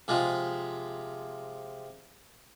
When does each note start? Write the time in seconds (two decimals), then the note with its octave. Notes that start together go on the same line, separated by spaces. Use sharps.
0.08 C3 F3 G#3